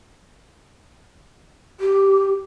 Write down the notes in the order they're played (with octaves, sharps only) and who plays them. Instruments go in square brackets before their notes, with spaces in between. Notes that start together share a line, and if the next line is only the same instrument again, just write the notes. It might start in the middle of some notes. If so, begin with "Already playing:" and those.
[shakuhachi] G4